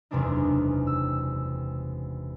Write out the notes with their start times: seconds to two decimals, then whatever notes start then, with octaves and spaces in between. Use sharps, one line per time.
0.11 F#1 E2 C3 G#3 D4 D#4
0.87 E6